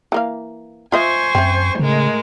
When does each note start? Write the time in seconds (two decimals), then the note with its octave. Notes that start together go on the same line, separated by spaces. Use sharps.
0.12 E3 A#3 F5
0.92 F4 C5 D#5 E5 G#5 C#6
1.35 F#2 C4 E5
1.79 A2 C#3 G#3 A#4